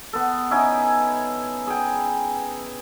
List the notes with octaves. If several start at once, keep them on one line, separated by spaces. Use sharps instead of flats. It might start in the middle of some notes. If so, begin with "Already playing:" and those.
B3 A4
C#4 D#4 E4 G#5
G#4 G5